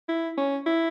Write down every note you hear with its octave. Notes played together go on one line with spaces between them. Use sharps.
E4
C#4
E4